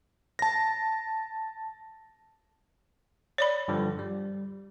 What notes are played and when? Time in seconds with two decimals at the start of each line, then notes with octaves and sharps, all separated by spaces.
0.39 A5 A#6
3.38 C#5 D5 B5
3.68 G2 D3 F3
3.99 G3